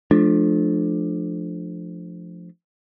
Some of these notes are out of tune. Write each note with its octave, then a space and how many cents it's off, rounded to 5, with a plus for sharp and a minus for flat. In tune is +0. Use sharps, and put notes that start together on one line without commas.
F3 +0 A3 -25 D4 +20